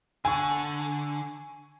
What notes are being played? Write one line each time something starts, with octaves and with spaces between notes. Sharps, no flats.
D3 G#5 C#6